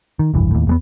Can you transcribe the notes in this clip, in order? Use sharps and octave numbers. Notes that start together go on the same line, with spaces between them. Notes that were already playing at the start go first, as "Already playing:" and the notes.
D#3
F1 B1 G2 E3
D#2 A2
E2 G#3 B3